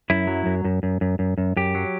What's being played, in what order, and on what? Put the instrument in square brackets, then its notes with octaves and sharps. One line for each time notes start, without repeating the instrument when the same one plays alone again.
[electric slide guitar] F#2 E4
F#3
F#2
F#2
F#2
F#2
F#2
F#2
F#2 G4
F#3